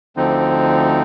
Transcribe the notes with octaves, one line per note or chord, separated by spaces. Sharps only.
D2 D3 F3 C4 D#4